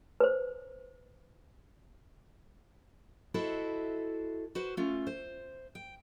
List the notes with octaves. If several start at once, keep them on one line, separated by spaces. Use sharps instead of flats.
B4 C5
E4 F#4 A4 C5 D#5 E5
F#4 B4 C5
A3 C#4 F4
C5
G5